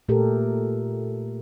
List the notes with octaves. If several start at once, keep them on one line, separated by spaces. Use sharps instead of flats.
A#2 A3 G4 A4 A#4